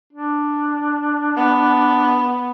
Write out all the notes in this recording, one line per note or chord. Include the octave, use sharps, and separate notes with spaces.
D4
B3